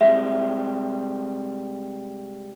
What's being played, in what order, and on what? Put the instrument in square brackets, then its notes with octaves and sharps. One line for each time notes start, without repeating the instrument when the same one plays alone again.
[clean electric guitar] C3 G3 G#3 [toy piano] E5